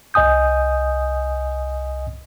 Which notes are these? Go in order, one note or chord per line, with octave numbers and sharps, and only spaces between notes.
C2 D#5 G#5 D#6 G6